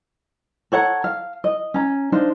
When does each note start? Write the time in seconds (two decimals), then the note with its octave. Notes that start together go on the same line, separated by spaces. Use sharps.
0.72 A4 C#5 F#5 A#5
1.04 F5
1.44 D#5
1.74 C#4 A#5
2.12 D4 D#4 C5 F5